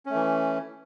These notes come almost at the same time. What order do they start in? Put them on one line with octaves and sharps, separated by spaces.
C#4 A3 E3